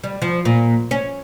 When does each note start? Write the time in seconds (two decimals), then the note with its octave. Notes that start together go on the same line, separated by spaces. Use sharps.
0.03 G3
0.22 F3
0.45 A#2
0.91 C#4